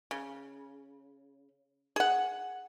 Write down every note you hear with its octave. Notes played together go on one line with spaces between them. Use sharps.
C#3
G#4 F#5